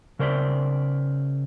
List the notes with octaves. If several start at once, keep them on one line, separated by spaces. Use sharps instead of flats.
C#3 A#4 C5 D5 E5